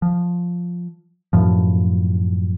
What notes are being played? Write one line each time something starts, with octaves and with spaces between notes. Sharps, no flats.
F3
F#2 A2 F3